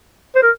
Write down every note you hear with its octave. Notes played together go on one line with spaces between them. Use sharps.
C5
A#4